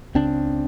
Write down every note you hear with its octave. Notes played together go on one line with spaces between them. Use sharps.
C#2 C#3 C4 D4